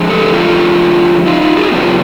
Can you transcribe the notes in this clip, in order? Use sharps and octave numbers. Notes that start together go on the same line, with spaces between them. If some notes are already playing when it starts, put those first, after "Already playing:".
Already playing: D3 F3 G#3
G4 A4
F4 G4
D#4 F4
D#4 F4
F#4 G#4
F#4
C#3 F#3 B3 F4 G4